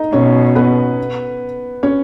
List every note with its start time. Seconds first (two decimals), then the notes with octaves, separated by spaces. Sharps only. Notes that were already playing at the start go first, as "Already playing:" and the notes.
Already playing: D#4 D#5
0.13 B2 C#4 C#5
0.55 B3 B4
1.83 C#4 C#5